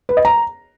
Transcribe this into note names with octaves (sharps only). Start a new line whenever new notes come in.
B4
D#5
A#5